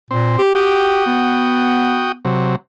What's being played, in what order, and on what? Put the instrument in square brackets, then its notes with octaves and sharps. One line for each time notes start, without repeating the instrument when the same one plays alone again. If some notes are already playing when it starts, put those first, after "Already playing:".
[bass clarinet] A#2 [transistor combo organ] C4
[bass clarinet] G4
[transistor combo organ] F#4 G5 D#6 [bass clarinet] G4
[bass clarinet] B3
[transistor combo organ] C3 F#3